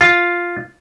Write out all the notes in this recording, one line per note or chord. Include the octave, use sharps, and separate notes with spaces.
F4